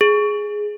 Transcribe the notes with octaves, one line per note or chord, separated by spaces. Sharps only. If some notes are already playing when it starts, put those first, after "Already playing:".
G#4